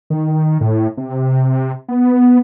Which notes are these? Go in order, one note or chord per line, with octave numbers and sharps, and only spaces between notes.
D#3
A2
C3
B3